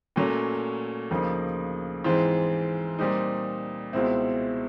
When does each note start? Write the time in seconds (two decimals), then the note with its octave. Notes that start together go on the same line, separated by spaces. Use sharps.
0.16 A#2 F#3 A3 C#4
1.11 D2 C#3 F3 A#3 D#4
2.04 G#2 E3 G#3 C4 F4
2.99 A#2 G3 C4 D#4
3.93 C#2 B2 G#3 C4 E4